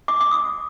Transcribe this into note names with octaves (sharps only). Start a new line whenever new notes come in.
D6
D6
D#6